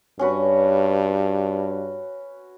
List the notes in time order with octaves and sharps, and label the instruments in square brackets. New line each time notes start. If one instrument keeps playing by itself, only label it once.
[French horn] G2 [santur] C#4 F#4 B4